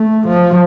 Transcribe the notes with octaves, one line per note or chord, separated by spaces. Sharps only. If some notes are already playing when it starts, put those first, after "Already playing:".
Already playing: A3
F3